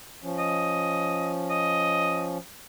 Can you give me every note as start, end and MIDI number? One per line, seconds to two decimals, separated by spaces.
0.23 2.38 53
0.23 2.38 61
0.39 1.32 75
1.50 2.28 75